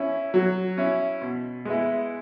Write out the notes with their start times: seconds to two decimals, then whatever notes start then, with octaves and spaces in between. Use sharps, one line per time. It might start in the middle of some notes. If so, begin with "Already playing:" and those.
Already playing: C#4 E4
0.34 F#3
0.77 C#4 E4
1.21 B2
1.65 G#3 B3 E4